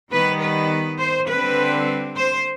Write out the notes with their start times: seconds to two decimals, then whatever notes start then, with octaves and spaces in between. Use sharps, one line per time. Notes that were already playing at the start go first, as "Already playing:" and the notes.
0.11 D#3 G3 B3 B4
0.41 B4
0.99 C5
1.28 D3 G3 C4 B4
2.16 C5